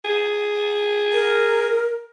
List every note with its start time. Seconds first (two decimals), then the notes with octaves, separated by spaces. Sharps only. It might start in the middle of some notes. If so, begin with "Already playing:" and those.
0.04 G#4
1.13 A#4